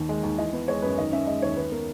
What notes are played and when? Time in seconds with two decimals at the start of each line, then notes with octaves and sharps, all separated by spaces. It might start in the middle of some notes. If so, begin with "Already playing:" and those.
Already playing: D#2 D#3
0.09 G#3
0.23 D#2
0.38 E3 D#5
0.53 B3
0.68 G#3 C#5
0.82 F#2 B4
0.98 D#3 D#5
1.12 C#4 E5
1.27 G#3 D#5
1.42 D#2 C#5
1.57 D#3 B4
1.72 B3 A#4